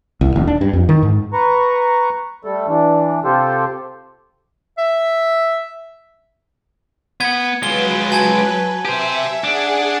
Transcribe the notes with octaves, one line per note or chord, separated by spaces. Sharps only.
C2
D#1
D4
G2
F2
D#3
G#2
B4 A#5 C#6
G3 A3 A4
E3 D4
C3 F4 G4 A4 C5
E5
B3 F#5 G#6
F#3 G#3 F4 B4 G7
G#5 A5 G#6
G4 C5 E5
D4 G#4 F#5